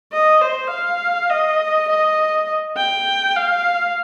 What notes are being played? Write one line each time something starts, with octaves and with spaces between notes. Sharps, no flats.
D#5
C5
F5
D#5
D#5
G5
F5